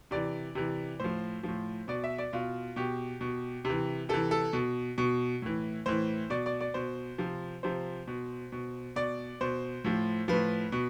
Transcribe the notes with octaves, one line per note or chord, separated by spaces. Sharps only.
C3 E3 D5
C3 E3
A2 F3 C5
A2 F3
B2 D5
E5
D5
B2 F4
B2 G4
B2
C3
E3
C3 E3 A4
A4
B2
B2
A2 E3
A2 E3 C5
B2 D5
D5
D5
B2 C5
C3 F3
C3 F3 C5
B2
B2
B2 D5
B2 C5
A2 F3
A2 F3 B4
B2